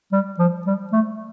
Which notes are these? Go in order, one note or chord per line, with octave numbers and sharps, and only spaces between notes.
G3
F3
G3
A3